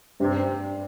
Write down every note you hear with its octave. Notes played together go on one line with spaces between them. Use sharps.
G2 C3